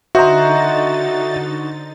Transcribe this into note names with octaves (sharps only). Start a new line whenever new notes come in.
D3 D#4 F#4 C5 D#5 E5 A#5 A6